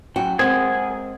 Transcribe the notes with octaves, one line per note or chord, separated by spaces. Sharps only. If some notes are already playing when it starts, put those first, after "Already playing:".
F#2 F#4 G5
G#3 C4 G#4 A#4 C5 F#5 G#5